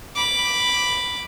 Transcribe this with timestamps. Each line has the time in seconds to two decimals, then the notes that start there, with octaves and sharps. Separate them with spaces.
0.15 B5 D6